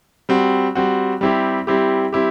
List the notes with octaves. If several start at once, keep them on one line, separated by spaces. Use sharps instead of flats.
G3 C4 F#4
G3 C4 F#4
G3 C4 E4 G4
G3 C4 E4 G4
G3 C4 E4 G4